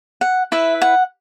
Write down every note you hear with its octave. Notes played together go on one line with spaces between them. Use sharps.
F#5
E4 B4 E5
F#5